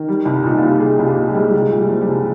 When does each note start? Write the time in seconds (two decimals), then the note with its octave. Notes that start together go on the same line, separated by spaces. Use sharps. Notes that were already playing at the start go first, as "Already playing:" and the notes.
Already playing: D#3 A#4
0.08 G3
0.25 C2
0.44 A#2 D#4
0.58 C2 F4
0.70 G4
0.80 C2 G#4
0.99 C2
1.05 G4
1.16 A#2
1.29 G#3
1.34 G3
1.48 G3
1.53 C2 G#3
1.71 A#2
1.78 G3
1.89 F3
2.01 G3
2.08 C2